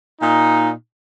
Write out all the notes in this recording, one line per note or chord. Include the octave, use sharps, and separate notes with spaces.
A#2 D#4